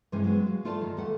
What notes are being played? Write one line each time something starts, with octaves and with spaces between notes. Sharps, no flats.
G2 C3 E3 G#3 C#4 C5
F#3 G#3 B3
F#4 F5
A3 F4 A4 D5 A5
F#2 D#3
D#2 A3 A4 F#5